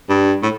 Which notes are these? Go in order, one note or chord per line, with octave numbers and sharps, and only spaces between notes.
G2
A2